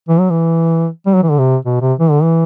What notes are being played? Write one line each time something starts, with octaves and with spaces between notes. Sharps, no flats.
E3
F#3
E3
G3
F#3
E3
D3
C3
B2
C3
E3
D3
E3